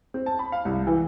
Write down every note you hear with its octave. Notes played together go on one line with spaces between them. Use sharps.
C4
A5
B5
F5
C2
E3